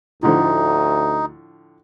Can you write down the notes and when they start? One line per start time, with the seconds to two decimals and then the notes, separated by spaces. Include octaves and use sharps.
0.23 D2 A2 D3 F3 D#4